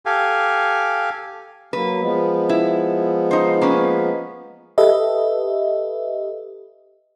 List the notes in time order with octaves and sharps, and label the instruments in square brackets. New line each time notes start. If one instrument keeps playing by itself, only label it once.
[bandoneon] G4 A4 F5 G#5
[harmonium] F#3 A#3 [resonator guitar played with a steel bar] B4
[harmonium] F3 G#3 B3
[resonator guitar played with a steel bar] E4
D#4 C5
A#3 C#4 B4
[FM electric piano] G4 A4 B4 D#5 E5